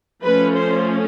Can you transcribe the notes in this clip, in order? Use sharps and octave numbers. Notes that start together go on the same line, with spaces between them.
F3 A3 C#4 B4
C5